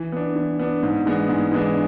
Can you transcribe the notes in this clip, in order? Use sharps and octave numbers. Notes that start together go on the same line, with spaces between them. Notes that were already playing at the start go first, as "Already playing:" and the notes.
Already playing: E3
B3 D4
E3
B3 D4
G#2
E3 G#3 B3 D4
G#2
E3 G#3 B3 D4